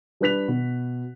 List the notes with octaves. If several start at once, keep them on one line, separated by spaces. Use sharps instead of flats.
G3 D4 B4 F#6 B6 F7
B2